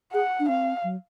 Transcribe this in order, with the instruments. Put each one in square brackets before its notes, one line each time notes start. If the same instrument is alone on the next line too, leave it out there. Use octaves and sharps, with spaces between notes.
[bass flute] G#4 [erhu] F#5
[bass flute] D4
[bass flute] C4 [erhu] F5
[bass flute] F#3